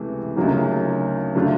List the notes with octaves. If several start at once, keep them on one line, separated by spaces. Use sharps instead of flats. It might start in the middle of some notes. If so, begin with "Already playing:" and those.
Already playing: C#2 C3 E3 A3
D2 C#3 F#3 A#3 D#4
D3 F#3 A3 D4 F4